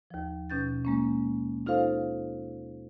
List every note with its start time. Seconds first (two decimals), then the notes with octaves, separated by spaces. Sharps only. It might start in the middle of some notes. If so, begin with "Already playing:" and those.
0.11 D#2 F3
0.50 B2 C#4 G6 A6
0.85 G#3 A#3 C#4
1.66 D#4 F4 A4 C5 F5